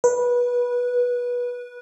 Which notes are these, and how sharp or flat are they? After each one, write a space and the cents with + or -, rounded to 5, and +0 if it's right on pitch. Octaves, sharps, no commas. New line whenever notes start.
B4 -20